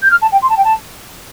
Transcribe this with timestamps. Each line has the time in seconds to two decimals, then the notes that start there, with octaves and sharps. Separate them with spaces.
0.02 G6
0.11 F6
0.21 A5
0.32 G5
0.42 C6
0.49 A5
0.57 G5
0.64 A5